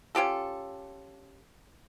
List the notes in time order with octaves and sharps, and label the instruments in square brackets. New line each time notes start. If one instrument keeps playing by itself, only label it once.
[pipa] C#4 F4 G4 A4